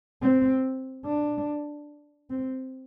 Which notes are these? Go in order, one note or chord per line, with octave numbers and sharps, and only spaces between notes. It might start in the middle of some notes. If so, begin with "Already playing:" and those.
C4
D4
C4